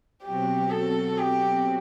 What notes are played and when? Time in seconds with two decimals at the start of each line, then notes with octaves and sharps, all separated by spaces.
0.23 B2 F#3 C4 F#4 G4
0.70 A4
1.17 G4